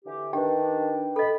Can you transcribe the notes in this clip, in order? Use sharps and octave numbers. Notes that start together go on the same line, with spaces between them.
D3 E3 G4
D#3 D4 G4 B4 G5
A4 D#5 B5